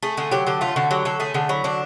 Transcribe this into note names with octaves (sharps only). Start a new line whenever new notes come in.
A3 G#4
D3 G#4
F#3 G4
D3 G4
A3 F4
D3 F#4
F#3 G4
D3 A4
A3 G#4
D3 G#4
F#3 E4
D3 D4